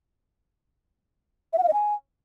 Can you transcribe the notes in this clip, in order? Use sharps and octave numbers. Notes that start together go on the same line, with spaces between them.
E5
F#5
F5
D#5
G#5